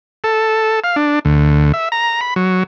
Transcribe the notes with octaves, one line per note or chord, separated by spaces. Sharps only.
A4
F5
D4
D2
E5
A#5
B5
F#3